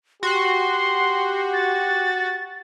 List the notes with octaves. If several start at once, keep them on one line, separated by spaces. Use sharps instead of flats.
F#4 G4 C6
A6